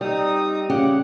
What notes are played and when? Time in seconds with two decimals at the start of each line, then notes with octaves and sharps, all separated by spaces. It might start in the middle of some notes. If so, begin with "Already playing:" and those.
0.01 G3 C4 D#4 D#6
0.70 C#3 G4 F#5